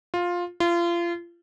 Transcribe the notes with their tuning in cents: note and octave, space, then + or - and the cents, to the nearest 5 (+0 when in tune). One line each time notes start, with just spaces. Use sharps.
F4 +10
F4 -30